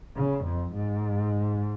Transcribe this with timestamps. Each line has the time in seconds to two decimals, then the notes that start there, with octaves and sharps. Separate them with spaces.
0.16 C#3
0.44 F2
0.73 G#2